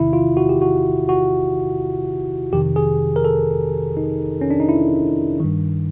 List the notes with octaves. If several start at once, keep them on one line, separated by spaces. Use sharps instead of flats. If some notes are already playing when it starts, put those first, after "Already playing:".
Already playing: E2 C3 D#3 E4
F4
F#4
G4
F#4
F#4
F2 C3 D#3 G4
G#4
A#4
A4
D#4
C#4
D4
D#4
E4
G2 D#3